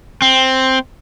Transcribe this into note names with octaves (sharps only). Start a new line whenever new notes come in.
C4